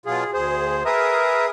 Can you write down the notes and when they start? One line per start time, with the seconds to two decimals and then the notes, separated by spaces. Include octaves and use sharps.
0.06 B2 F#3 F4 G#4
0.34 D2 G#4 C5
0.85 G#4 A#4 B4 E5 A#5 D#6